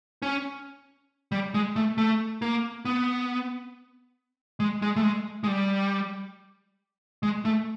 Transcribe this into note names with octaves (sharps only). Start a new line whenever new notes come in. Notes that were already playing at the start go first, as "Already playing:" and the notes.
C#4
G3
G#3
A3
A3
A#3
B3
G#3
G#3
A3
G#3
G#3
G3
G#3
A3